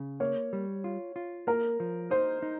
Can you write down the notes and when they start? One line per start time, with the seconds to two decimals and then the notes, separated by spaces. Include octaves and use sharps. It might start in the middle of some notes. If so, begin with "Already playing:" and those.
Already playing: C#3
0.20 A#3 C#5
0.53 G3
0.84 F4
1.16 F4
1.47 A#3 A#4
1.80 F3
2.11 D#4 C5
2.42 D#4